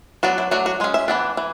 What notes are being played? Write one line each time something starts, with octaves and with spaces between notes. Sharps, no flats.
F#3 B3 D4 F#4
E4
F#3 A3 D4 F#4
F#4
G#3 C#4 G#4
E5
E3 B3 D4
E3